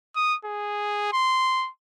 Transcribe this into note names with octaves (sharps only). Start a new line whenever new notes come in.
D#6
G#4
C6